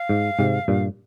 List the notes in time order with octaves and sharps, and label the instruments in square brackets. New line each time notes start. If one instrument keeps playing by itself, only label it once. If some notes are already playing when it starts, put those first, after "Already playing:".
Already playing: [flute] F5
[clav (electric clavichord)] G#2
G#2 C3
G2 A#2